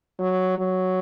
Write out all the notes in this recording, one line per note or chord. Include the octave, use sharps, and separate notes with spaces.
F#3
F#3